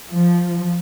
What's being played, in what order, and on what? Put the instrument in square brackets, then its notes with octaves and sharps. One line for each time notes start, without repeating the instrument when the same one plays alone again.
[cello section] F3